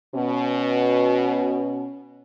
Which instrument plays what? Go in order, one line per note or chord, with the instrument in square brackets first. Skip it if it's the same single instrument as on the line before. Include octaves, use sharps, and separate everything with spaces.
[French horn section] B2 [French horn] C#4